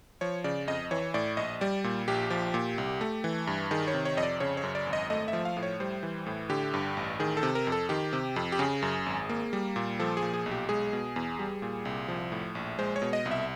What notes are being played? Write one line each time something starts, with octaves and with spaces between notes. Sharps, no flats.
F3 C#5
C#3 D5
F2 D#5
E3 C#5
A2 D5
A#1 D#5
G3 D5
A#2
A#1 G4
F3
A#2
C2
A3
E3
G2
D#3 G#4
C#5
C3
C#5
F2 D#5
D5
C#3 C#5
C#5
F#2
D5
G#1
D#5
A3 D#5
E5
F3
F5
A2
C#5
G3 C5
E3
A2
D3 G4
G2
A1
D#3 G#4
A4
C3
A#4
F2
A4
D#3 G4
C3
F2
G4
C#3 G#4
F#2
G#1
A#3
G3
A#2
F3 A4
G#4
A#2
G#4
B1
G4
G#3 G#4
B2
E2
G3
A#2
C2
F3
A2
A#1
G#3 C5
C#5
B2
D#5
C2
E5